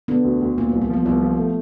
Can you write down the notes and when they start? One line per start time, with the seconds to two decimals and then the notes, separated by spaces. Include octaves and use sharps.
0.08 D3 B3
0.24 D2
0.41 D2
0.57 A#2 A#3
0.69 A3
0.73 C2
0.82 A#3
0.90 F3 B3
1.05 C2 B3
1.22 F3
1.39 A3